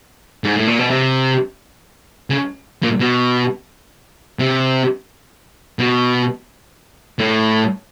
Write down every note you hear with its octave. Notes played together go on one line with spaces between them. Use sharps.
G#2
A2
A#2
B2
C3
C#3
A#2
B2
C3
B2
A2